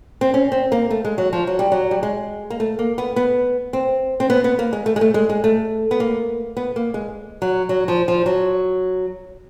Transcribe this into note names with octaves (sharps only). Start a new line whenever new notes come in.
C4
C#4
C4
A#3
A3
G#3
F#3
F3
F#3
G3
F#3
G3
G#3
A#3
A3
A#3
B3
B3
C4
C4
B3
B3
A#3
G#3
A3
G#3
A3
G#3
G#3
A3
B3
A#3
B3
A#3
G#3
F#3
F#3
F3
F3
F#3